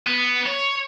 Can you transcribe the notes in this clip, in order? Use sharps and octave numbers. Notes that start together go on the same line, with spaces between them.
B3
C#5